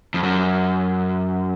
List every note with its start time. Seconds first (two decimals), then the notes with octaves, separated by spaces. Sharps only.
0.14 F2
0.23 F#2